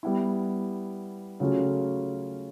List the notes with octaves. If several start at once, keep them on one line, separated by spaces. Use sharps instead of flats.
G3 B3 E4
C#3 F#3 A3 C#4 F4